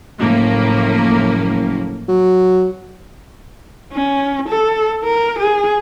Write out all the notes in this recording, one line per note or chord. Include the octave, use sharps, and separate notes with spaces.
F#1 A2 F3 A#3
F#3
C#4
A4
A#4
G#4